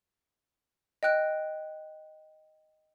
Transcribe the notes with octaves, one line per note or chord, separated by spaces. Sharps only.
D#5 G5 F#6 D7